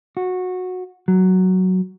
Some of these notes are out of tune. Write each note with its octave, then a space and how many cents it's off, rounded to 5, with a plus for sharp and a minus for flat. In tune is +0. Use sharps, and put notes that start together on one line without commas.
F#4 -15
F#3 +5